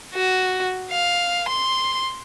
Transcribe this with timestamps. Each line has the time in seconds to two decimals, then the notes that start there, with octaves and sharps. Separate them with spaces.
0.14 F#4
0.91 F5
1.49 C6